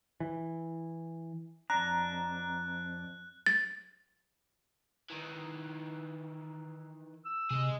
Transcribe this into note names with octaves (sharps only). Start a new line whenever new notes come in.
E3
F2 D4 A#5 F#6
A6
D#3 E3
E6
C3 G#4 D#5